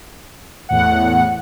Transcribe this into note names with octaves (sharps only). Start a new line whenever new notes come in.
E2 A2 F#5